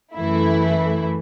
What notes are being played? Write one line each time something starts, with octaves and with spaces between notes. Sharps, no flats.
F#2 E3 A3 E4